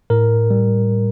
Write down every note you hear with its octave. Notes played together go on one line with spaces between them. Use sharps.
A2 A#4
G3